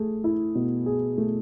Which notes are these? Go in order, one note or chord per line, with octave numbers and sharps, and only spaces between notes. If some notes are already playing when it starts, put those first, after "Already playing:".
Already playing: A3 G#4
E4
B2
G#4
A3